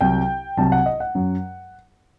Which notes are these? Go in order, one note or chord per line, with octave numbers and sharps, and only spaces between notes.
C2 C3 F#3 G5
C2 C3 F#3 A5
F#5
D#5
F#5
F#2 F#3